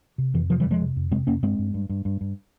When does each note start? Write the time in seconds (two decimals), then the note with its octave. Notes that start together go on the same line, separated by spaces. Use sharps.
0.18 C3
0.34 F2 E3
0.50 C3 F3
0.60 E3 G3
0.65 F2
0.71 F3 G#3
0.81 C3
0.96 F2
1.12 C3 G#3 C4
1.27 F2 A#3 C#4
1.43 G2 G#3 C4
1.59 G2
1.74 G2
1.89 G2
2.05 G2
2.21 G2